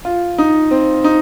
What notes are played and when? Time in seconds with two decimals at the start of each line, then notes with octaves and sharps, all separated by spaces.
0.05 F4
0.38 D#4
0.71 C4
1.04 D#4